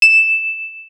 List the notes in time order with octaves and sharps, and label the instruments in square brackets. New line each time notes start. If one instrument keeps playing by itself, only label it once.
[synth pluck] E7